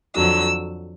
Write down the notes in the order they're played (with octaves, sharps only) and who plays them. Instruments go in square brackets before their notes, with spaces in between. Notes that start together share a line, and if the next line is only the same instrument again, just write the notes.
[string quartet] F2 D3 F#3 E6